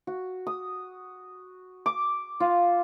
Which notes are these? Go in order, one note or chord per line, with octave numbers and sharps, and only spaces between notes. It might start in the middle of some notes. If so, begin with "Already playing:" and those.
F#4
D#6
D6
F4